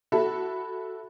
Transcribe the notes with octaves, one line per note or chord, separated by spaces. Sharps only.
E4 F#4 A4 E5 B5